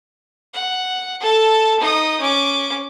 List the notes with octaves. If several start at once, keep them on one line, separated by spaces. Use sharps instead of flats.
F#5
A4 A5
D#4 D#6
C#4 D6